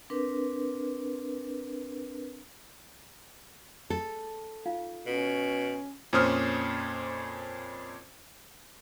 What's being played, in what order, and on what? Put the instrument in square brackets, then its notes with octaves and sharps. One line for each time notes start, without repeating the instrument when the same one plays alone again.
[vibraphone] C4 D4 A#4 B4
[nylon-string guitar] A4
[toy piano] D#4 F4 F5
[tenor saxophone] B2 [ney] C#4
[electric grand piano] F2 A#2 C#4 C5 D#6 F6